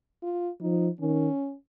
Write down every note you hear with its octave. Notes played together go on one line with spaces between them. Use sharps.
F4
F3 D#4
D#3 C#4